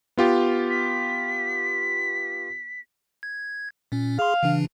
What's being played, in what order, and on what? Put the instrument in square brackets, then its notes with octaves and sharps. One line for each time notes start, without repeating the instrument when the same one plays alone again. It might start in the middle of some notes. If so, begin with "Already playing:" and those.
[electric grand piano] B3 F4 G4
[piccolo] B6
[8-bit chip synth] G#6
A#2 C#4
[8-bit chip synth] G#4 C6 [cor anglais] F5
[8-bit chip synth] C#3 E3 D4